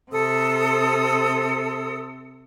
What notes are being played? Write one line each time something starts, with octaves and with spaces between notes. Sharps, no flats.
C3 A4 D#6 E6